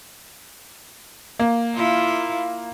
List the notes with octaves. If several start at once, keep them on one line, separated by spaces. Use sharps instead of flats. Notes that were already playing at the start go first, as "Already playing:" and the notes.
A#3
E4 F4